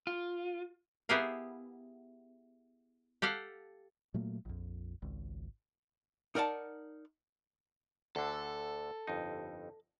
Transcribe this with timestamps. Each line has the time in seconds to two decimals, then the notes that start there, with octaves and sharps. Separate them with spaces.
0.07 F4
1.09 B3 E4 G4 G#4 A#4 F5
3.22 G4 A4 F5 F#5
4.14 A#2 F#3 A3 A#3
4.45 A#1 F2
5.02 G#1 C#2
6.35 D#4 A#4 D5 F#5 A5
8.16 D2 D3 A4
9.07 G1 F2 D#4